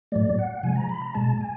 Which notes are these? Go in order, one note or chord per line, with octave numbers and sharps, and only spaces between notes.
A2 F#3 A3 D5
F#5
C3 F3 G#3 G#5
A#5
B5
A#5
B2 G#3 A5
G#5